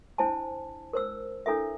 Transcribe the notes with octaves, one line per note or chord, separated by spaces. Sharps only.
D4 E4 C5 G#5 A5
A#4 C5 E6
D4 E4 A4 A#4 E5